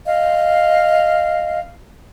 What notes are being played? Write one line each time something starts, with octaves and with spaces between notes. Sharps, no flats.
D#5 F5